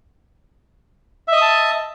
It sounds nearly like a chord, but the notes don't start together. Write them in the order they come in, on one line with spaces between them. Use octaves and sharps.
E5 D#5 D#6 A5